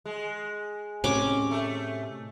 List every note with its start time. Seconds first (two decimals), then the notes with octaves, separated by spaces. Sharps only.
0.05 G#3
1.04 A2 C3 C#4 D6
1.51 A3